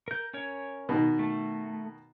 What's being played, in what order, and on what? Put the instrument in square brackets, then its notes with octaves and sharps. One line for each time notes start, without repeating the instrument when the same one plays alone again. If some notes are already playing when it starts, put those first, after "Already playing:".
[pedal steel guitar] A#4 G6
C#4 A#4 C#5
[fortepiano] B2 D#3
[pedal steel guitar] A3